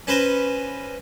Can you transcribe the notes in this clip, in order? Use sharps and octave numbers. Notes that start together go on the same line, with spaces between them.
C#4 B4 C5 A#5